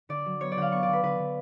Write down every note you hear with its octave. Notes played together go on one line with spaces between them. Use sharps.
D3 D5
F#3
B3 C#5
D5
D3 F5 F#5
B3 C#6
D5
D3 B4
D3 B4
D3